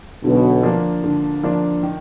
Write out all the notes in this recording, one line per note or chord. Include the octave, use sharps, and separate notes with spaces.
B1 B2 D3
F3 A#3 D4
D3
F3 A#3 D4
D#3